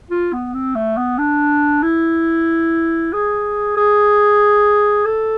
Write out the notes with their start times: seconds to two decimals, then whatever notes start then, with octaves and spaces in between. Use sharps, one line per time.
0.11 F4
0.32 B3
0.54 C4
0.75 A3
0.97 B3
1.18 D4
1.83 E4
3.13 G#4
3.77 G#4
5.05 A4